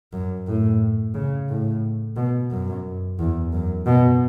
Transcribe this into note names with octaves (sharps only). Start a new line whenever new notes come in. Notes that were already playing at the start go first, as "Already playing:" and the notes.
F#2
A2
C#3
A2
B2
F#2
E2
F#2
B2